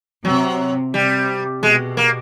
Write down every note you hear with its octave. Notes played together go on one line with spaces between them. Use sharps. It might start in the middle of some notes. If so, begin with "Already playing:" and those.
C3 F#3
C3 G3
B2 G#3
A#3